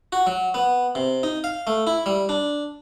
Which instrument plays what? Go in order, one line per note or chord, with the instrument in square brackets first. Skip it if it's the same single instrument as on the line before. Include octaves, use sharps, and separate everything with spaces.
[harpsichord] F#4
F#3
B3
C3
D#4
F5
A3
E4
G3
D4